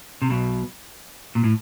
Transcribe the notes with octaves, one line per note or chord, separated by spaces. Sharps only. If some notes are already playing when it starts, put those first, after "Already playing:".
C3
B1 B2
A#2
A2